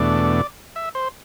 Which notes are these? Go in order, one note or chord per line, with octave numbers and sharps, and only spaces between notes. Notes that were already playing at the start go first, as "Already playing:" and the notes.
Already playing: E2 B2 A3 D4 D5
E5
C5